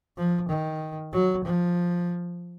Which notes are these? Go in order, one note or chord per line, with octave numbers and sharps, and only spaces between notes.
F3
D#3
F#3
F3